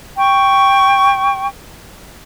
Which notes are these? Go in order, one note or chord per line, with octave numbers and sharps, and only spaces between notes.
G5 C#6